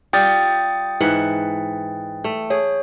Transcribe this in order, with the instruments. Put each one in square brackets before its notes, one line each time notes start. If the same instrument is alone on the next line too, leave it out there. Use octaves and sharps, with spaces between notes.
[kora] G3 F4 G4 [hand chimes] G5 D#6 A6
[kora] G#2 E3 F#5
A3
[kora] G#4 [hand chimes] C#5